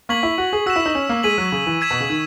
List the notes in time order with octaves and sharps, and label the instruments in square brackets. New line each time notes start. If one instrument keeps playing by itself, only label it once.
[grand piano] A#3 [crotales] C#6 G#6 B6 F#7
[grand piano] E4
F#4
G#4
[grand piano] F#4 [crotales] E6 B6 E7
[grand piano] E4
D#4
C#4
A#3
[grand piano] G#3 [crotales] G#6 B6 D#7 F#7
[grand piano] F#3
C#3
E3
[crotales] E6 G#6 B6 E7
[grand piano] B2
C#3
D#3